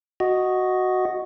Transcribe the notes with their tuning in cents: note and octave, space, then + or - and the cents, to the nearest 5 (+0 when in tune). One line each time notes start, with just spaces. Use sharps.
F#4 +0 D#5 +0